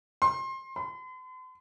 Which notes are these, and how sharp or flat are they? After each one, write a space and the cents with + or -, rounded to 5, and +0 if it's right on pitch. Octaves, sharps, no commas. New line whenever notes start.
C6 +25
C6 -45